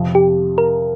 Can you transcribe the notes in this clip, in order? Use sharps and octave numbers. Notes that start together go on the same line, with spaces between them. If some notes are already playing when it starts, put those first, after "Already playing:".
Already playing: F2 C3 F3
G4
A#4